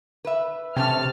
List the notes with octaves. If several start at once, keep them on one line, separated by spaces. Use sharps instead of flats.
B4 E5
C3 A3 C#4 G5 A5 F6